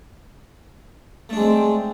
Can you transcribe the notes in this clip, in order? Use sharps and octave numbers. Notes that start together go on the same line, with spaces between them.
G#3 A3 C4 D4